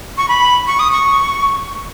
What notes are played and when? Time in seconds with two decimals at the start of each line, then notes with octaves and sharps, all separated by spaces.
0.18 C#6
0.29 B5
0.67 C#6
0.79 D#6
0.92 C#6